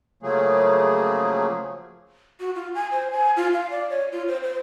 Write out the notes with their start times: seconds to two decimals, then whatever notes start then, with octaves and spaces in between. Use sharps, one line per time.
0.23 C#3 F3 F#3 A3 A#3 G#4
2.40 F#4
2.55 F4
2.75 G#5
2.91 C5
3.12 G#5
3.37 F4
3.53 F5
3.70 D5
3.90 C#5
4.12 F4
4.28 C5
4.43 C5